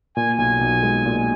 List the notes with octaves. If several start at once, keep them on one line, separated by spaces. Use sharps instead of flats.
A#2 G#5
B1 G#5
B1
G#3
A#2